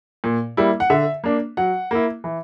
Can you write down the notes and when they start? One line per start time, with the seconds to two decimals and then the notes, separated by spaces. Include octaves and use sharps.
0.24 A#2
0.57 G3 A#3 E4
0.80 F#5
0.90 D3 E5
1.24 A#3 D4
1.57 F#3 F#5
1.91 A#3 E4
2.24 E3